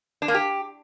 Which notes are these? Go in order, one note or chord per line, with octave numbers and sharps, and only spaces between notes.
D4
A#3
G4